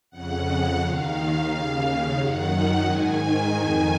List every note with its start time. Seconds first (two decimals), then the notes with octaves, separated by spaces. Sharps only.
0.10 F2 C#3 F#5
0.79 D#2 D#3 F5
1.49 D#2 C#3
2.18 F#2 D#3 F#5
2.87 G#2 D#3 G#5
3.56 F2 D#3